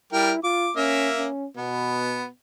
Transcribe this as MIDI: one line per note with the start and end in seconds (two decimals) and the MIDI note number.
0.13 0.32 55
0.13 0.41 64
0.13 0.32 70
0.13 0.32 79
0.44 0.70 65
0.44 0.73 86
0.76 1.27 58
0.76 1.09 61
0.76 1.27 76
1.18 1.47 61
1.57 2.27 47
1.57 2.27 59